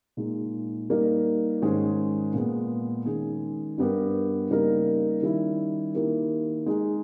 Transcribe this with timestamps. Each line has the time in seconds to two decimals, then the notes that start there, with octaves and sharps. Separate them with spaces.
0.17 A#2 G#3 D#4
0.90 G3 A#3 D#4 A#4
1.62 G#2 D#3 G#3 C#4 G#4
2.34 A#2 G#3 B3
3.06 D#3 G#3 C#4 G#4
3.78 G2 G3 B3 G4 A#4
4.50 C#3 G3 A#3 D#4 A#4
5.22 D#3 G3 C#4 E4
5.94 D#3 A#3 E4 G4 A#4
6.66 G#3 D#4 G#4